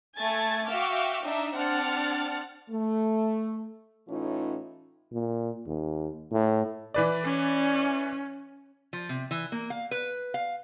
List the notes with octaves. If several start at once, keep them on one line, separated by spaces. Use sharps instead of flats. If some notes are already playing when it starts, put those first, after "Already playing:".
A3 G#5 G#6 A6
F#4 E5 F5 G5 D6 F6
D4 D#4 E5
C4 D4 F#5 F6 A6
A3
A2 E3 C#4 D#4 F4
A#2
D#2
A2
E3 B4 D5
C#4
F3
C3
E3
A#3
F5
B4
F5